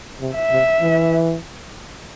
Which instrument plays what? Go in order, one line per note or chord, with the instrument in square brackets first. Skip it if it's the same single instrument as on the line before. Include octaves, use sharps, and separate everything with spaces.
[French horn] C3
[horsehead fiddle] E5
[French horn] C3
E3